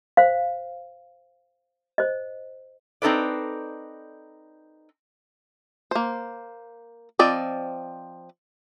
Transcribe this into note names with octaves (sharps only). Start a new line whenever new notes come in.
C5 F5
C5 D#5
C4 D#4 A4 B4 D5
A#3 C5
F3 C4 D5 D#5